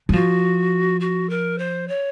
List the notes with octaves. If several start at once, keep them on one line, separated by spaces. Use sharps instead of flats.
F#3
F3 F#4
F#4
A#4
C5
C#5